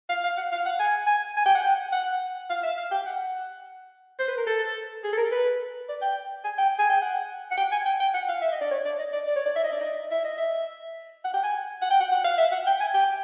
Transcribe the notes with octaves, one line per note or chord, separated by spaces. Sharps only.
F5
F5
F#5
F5
F#5
G#5
G#5
G#5
G5
F#5
G5
F#5
F5
E5
F5
G5
F#5
C5
B4
A#4
A4
G#4
A4
A#4
B4
D5
G5
G#5
G5
G#5
G5
F#5
F#5
G5
G#5
G5
G5
F#5
F5
E5
D#5
D5
C#5
D5
D#5
D5
D5
C#5
D5
E5
D#5
D5
D#5
E5
D#5
E5
F#5
G5
G#5
F#5
G5
F#5
F#5
F5
E5
F#5
G5
G#5
G5